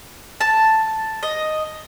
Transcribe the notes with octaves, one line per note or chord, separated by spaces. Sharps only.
A5
D#5